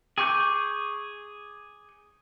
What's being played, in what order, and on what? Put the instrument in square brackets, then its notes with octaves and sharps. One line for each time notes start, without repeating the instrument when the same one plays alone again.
[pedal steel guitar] G#4 G#5 C#6 D6 G6